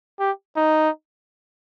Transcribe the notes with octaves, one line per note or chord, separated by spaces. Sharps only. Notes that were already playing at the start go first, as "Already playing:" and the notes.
G4
D#4